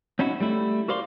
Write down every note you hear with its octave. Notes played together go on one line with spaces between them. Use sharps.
C4 C#4 D#4 E4 F#4
G3 A3 E4
F#4 A#4 C5 D5 F5 C6